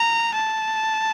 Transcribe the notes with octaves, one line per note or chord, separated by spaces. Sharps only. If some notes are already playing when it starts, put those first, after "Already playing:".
Already playing: A#5
A5